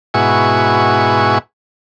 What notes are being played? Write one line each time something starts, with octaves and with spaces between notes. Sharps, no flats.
G#2 B2 E4 F#4 G#5 C#6